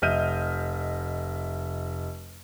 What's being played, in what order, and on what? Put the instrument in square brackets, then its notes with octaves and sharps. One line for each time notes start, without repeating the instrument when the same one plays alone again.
[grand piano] F1 D#5 E5 F6 G6 D#7